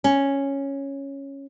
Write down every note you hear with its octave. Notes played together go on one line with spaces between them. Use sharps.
C#4